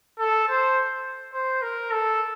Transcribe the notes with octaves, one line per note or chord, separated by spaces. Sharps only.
A4
C5
C5
A#4
A4